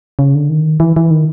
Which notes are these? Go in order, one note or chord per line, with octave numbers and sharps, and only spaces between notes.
C#3
D3
D#3
E3
E3
D#3